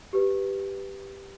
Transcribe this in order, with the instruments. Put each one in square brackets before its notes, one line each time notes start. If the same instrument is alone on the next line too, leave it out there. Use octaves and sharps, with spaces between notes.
[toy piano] G4 B4